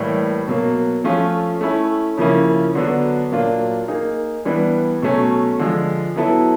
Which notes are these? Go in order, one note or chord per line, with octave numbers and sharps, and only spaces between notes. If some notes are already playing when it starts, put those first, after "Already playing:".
Already playing: A2 E3 G3 A#3
B2 F#3 A#3
F3 A3 C#4 F4
A3 C#4 E4
C#3 F3 A#3 C#4 E4
D3 F#3 B3 D4 F#4
A#2 F#3 A#3 D4 F4
A#3 D#4 G#4
E3 G3 B3 D4
B2 F#3 A3 C#4
D3 F3 G#3
F#3 B3 E4 A4